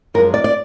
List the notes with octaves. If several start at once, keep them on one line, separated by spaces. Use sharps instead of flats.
F#2 F3 G#3 A#4
D5
D5